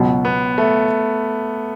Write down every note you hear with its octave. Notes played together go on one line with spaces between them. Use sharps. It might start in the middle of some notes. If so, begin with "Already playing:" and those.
Already playing: C#2 B2 F#3
B3
A3